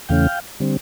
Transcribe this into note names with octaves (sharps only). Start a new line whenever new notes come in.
E2 C#3 E3 A3 C#4 F5 G5
D3 G3 C4